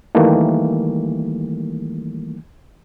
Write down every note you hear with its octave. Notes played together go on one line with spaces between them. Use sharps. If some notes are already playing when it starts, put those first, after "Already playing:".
D#3 E3 G3 A3 A#3